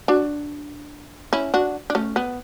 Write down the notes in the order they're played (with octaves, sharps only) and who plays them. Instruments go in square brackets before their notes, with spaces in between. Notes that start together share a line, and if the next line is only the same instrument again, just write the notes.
[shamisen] D4 F#4
C#4 E4
D4 F#4
D4
A3 C#4
B3